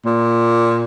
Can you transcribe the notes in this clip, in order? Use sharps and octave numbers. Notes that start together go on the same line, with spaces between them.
A#2